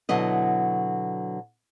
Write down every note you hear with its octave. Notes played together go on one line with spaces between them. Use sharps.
B2 D3 F#3 E4 D#5